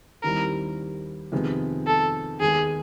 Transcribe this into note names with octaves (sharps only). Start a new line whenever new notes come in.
D#2 D#3 G3 C4 E4 A#4
F2 C3 D#3 G#3 B3
A4
D#2 D#3 G#3 B3 G#4